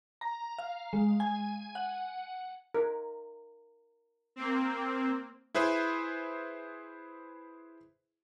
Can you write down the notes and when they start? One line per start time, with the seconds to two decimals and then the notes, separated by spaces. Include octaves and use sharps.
0.21 A#5
0.58 F5
0.93 G#3
1.20 G#5
1.75 F#5
2.74 A#4
4.36 A#3 C4
5.55 E4 G#4 B4 C5 E5